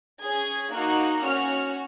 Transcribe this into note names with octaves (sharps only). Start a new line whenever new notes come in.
C#4 G#4 G#6
A#3 D#4 F#4 F#6
C#4 F#4 F6